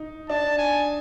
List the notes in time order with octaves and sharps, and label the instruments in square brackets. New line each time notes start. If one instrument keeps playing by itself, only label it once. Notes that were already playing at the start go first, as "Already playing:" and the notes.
Already playing: [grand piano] D#4
[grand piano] D4 [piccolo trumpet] A5
[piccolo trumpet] G#5